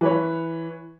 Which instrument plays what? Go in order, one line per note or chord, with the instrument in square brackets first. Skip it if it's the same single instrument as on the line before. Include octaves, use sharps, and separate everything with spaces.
[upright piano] E3 B4 C#5